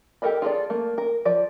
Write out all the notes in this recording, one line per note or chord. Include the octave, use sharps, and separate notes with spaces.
G4 A4 A#4 D#5 B5
F4 G#4 A4 D5
A3 A#3
A#4
F3 D5